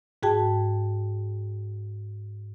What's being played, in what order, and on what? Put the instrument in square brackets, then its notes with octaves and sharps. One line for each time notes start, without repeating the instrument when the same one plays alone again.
[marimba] G#2 F#4 G#4 G5 A5